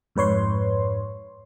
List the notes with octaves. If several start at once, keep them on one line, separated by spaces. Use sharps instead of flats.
F2 G#2 B4 C#5 C6